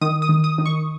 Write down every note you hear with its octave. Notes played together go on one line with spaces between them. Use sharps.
D#3 D#6
D#6
D#3
D#6
D#3
C#6